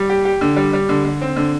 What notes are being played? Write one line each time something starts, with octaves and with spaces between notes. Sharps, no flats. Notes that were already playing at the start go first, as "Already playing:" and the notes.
Already playing: G3
G4
G4
D3
G3
G3
D3
D3
C4
D3